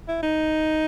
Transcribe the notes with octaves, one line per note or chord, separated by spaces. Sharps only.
E4
D#4